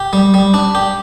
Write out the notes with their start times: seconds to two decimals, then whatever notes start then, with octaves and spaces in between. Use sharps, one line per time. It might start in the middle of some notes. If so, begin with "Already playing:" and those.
Already playing: G4
0.13 G3
0.34 G3
0.54 D4
0.75 G4